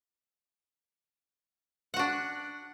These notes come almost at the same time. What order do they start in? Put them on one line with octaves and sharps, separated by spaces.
F#5 F#4 D4